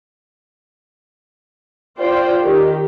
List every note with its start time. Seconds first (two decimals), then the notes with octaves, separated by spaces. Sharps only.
1.97 F4 C5 D5 G5
2.42 D#3 G4